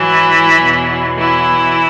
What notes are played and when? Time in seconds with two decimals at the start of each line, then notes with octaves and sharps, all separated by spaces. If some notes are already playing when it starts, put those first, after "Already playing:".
Already playing: G#2 E3 F#3 E4
0.60 E2 B2 F#3
1.18 E3 E4